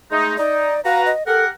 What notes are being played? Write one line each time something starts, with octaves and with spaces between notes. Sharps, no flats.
G#3 A3 D#4
D#4 D5
F#4 B4 F5 A#5
D#5
G4 A4 A#4 F#5